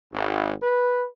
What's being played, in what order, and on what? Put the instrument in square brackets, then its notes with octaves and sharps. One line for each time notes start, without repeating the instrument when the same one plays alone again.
[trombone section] G#1
B4